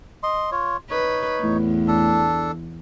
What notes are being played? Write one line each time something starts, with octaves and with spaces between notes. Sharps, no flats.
D#5 C6
F4 C#5
D#4 B4 C#5
E2 A2
D4 A4